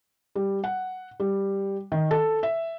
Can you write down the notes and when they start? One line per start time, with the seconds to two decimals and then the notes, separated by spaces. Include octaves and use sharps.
0.35 G3
0.64 F#5
1.20 G3
1.92 D#3
2.11 A4
2.43 E5